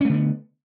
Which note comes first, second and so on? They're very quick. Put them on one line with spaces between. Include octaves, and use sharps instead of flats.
C#4 A3 D3 B3